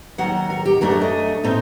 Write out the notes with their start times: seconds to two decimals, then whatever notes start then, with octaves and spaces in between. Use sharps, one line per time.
0.18 D#2 D#3 F#3 F#5
0.50 A#4
0.66 G4
0.81 F#2 F#3 A3 D4 A#4
0.91 D5
1.02 D#5
1.44 A#2 A3 C4 D#4